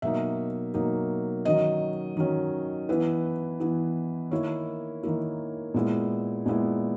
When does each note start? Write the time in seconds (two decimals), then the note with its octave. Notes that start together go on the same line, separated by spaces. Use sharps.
0.02 B2 F#3 A#3 D#4 E5
0.74 B2 F#3 A#3 D#4
1.45 D#3 F#3 C#4 D#5
2.17 D#3 F#3 C#4
2.89 E3 B3 E4 B4
3.60 E3 B3 E4
4.31 D#3 A#3 E4 C#5
5.03 D#3 A#3 E4
5.74 A#2 G#3 B3 E4
6.46 A#2 G#3 B3 E4